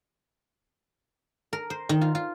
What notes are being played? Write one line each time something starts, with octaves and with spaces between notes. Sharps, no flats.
A#4
C5
D#3
F4
F4